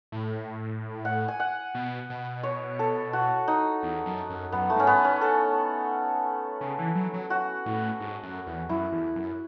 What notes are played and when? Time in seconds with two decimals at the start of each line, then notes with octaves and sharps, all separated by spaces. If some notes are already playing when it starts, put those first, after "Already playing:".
0.12 A2
1.05 F#5
1.28 G#5
1.40 F#5
1.75 B2
2.10 B2
2.43 C#5
2.79 A4
3.13 F#4
3.48 D#4
3.83 E2
4.06 F#2
4.30 F#2
4.52 F#2 B3
4.70 A3
4.76 G#2 C#4
4.87 B3
5.04 C#4
5.21 A4
6.61 C#3
6.79 E3
6.95 F#3
7.14 F#3
7.30 F#4
7.66 A2
8.00 G#2
8.23 F#2
8.47 E2
8.69 F#2 E4
8.92 E2
9.16 F#2